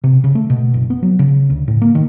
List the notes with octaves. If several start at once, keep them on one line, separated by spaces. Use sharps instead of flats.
C3
C#3
A3
B2
F#1
B3
F#3
C#3
D2
A2
A#3
D#3